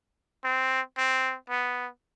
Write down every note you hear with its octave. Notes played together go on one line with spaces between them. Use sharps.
C4
C4
B3